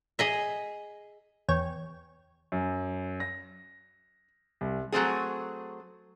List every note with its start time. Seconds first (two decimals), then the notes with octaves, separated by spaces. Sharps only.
0.19 G#4 D#5 E5
1.48 E2 C#5 G5
2.52 F#2
3.20 A#6
4.61 C2
4.92 F#3 A3 C4 G#4